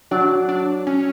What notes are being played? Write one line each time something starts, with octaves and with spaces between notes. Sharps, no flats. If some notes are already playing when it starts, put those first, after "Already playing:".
F#3 D4
D4
C#4